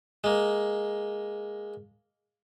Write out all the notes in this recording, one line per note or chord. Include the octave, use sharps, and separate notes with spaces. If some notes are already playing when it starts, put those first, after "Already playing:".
G#3 A#3